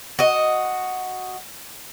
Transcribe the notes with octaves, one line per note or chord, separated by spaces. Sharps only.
F#4 D#5